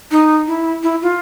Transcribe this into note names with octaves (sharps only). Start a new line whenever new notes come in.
D#4
E4
E4
F4